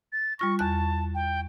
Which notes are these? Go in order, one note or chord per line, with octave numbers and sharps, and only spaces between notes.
A6
G3 F4 C#6 A#6
E2 A5 F#6
G5